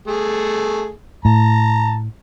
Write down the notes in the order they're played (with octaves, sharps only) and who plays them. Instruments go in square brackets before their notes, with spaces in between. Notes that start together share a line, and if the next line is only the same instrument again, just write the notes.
[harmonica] A3 G#4
[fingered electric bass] A2 [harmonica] A5 A#5